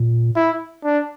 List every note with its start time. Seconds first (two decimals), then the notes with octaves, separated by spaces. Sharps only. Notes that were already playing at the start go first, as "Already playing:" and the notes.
Already playing: A#2
0.36 E4
0.85 D4